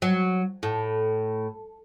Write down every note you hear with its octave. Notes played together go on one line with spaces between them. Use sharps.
F#3
A2